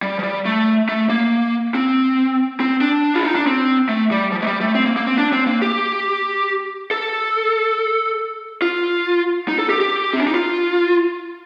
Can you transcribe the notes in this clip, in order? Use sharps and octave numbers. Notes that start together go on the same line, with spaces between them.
G3
F3
G3
A3
A3
A#3
C4
C4
D4
F4
D#4
D4
C4
A3
G3
F3
A3
G3
A3
C4
A#3
A#3
C4
D4
C4
A#3
G4
A4
F4
D#4
A4
G4
G4
C4
D4
D#4
F4